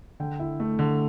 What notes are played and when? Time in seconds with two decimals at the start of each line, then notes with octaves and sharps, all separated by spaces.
0.20 D3 G5
0.40 E4
0.60 A3
0.79 D3